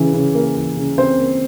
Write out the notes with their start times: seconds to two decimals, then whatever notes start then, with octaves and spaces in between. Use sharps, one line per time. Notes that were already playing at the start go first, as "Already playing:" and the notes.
Already playing: C#3 E3
0.14 C#3
0.35 A#3
0.56 E3
0.77 C#3
0.98 C#3 C4 C5
1.19 A#3